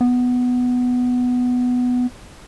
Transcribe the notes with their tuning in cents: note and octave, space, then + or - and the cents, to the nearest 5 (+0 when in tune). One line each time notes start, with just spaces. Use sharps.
B3 +5